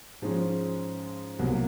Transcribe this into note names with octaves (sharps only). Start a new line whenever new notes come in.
G#2 F3 G#3 C#4
C2 B2 F#3 A#3